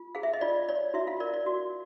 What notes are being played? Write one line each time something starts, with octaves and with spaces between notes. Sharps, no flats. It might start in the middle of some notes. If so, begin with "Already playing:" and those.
Already playing: F4
G#4 F5
E5
D#5
F4 D5
C#5 D5
E4 F#4 E5
F4 F5
A#4 D5
D5
F#4